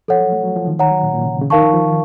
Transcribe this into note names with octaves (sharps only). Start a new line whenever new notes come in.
F3 A4 C#5 F#5
F#3
A3
F#3
F3
D#3
D#3 C#5 F#5 A#5
F#3
A#2
A#2
C#3
C3
C#3
D#3 D#4 A#4 F5 A5 C#6
F3
F3
D#3